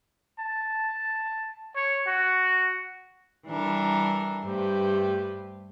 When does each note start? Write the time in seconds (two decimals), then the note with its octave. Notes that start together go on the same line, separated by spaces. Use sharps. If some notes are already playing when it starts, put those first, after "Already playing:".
0.39 A5
1.76 C#5
2.07 F#4
3.47 E3 G3 D4 A4 A#4
4.45 G2 G3 A3 G4 B4 C5